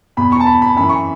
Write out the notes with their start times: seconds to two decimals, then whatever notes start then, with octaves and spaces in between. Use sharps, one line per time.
0.17 E2 B2 B5
0.32 C#6
0.40 A5
0.46 B5
0.62 B5
0.76 F#2 E3 B5
0.89 C#6